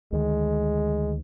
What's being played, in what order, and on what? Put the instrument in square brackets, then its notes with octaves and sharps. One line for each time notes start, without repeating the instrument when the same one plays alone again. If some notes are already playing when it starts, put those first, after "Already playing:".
[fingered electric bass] D2 D#3 [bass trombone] G#3